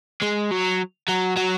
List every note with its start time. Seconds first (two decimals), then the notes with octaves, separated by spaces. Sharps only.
0.22 G#3
0.51 F#3
1.09 F#3
1.37 F#3